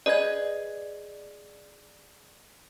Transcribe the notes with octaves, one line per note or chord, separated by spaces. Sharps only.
G#4 B4 D5 D#5 G#6